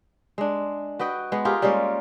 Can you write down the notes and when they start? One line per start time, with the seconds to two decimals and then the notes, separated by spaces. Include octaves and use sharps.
0.38 G#3 D4
0.99 F#4 B4 D#5 G5
1.32 G#3 B3
1.45 F4 G4 G#4 A#4
1.62 G3 G#3 A#3 C#4